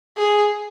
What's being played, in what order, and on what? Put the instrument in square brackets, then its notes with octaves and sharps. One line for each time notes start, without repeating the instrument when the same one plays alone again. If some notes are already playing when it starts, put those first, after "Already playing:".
[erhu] G#4